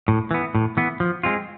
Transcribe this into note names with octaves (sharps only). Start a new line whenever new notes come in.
A2
E3 B3
A2
E3 B3
F3
G#3 C4 F4